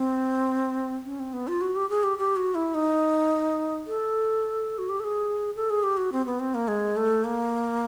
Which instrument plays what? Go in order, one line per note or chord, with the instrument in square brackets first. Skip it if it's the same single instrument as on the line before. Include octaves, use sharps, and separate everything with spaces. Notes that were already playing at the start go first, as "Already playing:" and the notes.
Already playing: [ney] C4
C#4
C4
B3
F4
F#4
G4
G#4
G4
G4
F#4
E4
D#4
A4
F#4
G4
A4
G#4
A4
G#4
G4
F#4
C4
B3
C4
A#3
G#3
A3
A#3